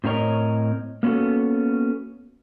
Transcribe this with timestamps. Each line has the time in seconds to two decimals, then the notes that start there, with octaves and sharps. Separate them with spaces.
0.04 A2 C4 F4 A#4 C#5 D#5
1.03 A#3 B3 C#4 F#4 A4